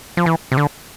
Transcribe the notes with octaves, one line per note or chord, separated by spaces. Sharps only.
F3
E3
C3
D3